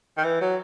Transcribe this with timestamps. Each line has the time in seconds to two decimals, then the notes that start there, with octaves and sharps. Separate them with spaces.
0.17 D#3
0.24 E3
0.41 F#3